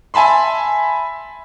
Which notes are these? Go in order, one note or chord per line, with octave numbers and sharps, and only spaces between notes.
E5 G#5 A5 B5 C6